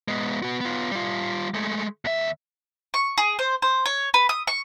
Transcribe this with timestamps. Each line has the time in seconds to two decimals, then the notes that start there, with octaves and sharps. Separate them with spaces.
0.08 G#3 B3
0.43 B3 F#4
0.61 B3 F4
0.91 G3 F4
1.54 G#3 A3
2.05 D#2 E5
2.94 C#6
3.18 G#4
3.39 C5
3.62 C5
3.86 C#5
4.14 B4
4.29 D#6
4.47 C#6